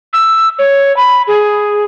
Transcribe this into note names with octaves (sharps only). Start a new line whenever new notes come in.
E6
C#5
B5
G#4